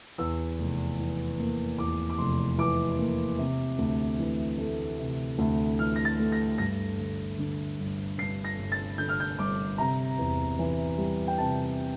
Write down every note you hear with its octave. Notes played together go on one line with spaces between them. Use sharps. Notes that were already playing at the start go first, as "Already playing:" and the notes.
E2 E6
F1
E3
A#3
E2 D6
D6
F1 C6
E3 D6
A#3
C3
D2
E3
A3
C3
D2
E3 F6
A#6
A6
A3
A#6
G2 A#6
G1
D3
G1
G2 C7
A#6
G1
A6
D3 G6
F6
G6
G1 D6
C3 A#5
E2
E3
G3
G5
C3 A5